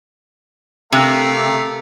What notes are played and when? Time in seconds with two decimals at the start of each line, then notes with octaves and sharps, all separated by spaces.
0.92 C3 A3 A#4 F5